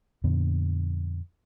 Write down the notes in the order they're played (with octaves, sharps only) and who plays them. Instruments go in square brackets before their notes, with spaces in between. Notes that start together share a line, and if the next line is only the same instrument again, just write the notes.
[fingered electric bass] F2 A#2 D3 B3